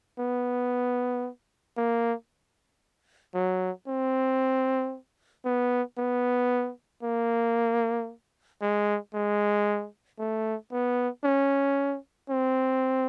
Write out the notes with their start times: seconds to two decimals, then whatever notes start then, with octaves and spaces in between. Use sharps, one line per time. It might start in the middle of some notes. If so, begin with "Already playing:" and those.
0.19 B3
1.77 A#3
3.34 F#3
3.87 C4
5.45 B3
5.98 B3
7.03 A#3
8.61 G#3
9.14 G#3
10.19 A3
10.72 B3
11.24 C#4
12.30 C4